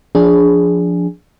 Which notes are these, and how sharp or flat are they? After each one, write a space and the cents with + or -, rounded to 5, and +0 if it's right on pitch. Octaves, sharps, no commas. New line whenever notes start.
F3 +0 D4 -15 G#4 +0